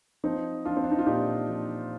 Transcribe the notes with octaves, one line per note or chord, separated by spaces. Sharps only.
F3 C4 D#4
F3 D4 F4
C4
D4
D#4
F4
A#2 D#4 G4
F3